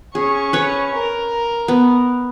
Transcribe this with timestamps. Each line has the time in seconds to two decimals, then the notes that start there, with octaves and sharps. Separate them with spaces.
0.15 C#4 G#4 C#6
0.53 B4 C#5
0.96 A#4
1.68 B3